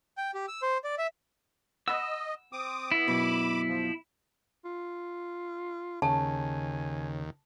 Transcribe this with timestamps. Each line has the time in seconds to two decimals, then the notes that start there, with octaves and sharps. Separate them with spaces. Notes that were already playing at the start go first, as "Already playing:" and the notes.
0.18 G5
0.34 G4
0.48 E6
0.62 C5
0.84 D5
0.98 E5
1.88 D#5 F#5 B5 E6
2.53 C4 D6 D#6
2.92 B3 E4
3.08 F#2 B2 B5 D6
3.68 F3
4.65 F4
6.02 D#2 C#3 C#5 G#5 A5